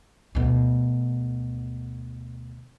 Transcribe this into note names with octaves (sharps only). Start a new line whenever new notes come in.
D2 B2